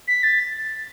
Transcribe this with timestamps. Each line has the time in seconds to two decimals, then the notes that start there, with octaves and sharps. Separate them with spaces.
0.07 B6
0.23 A6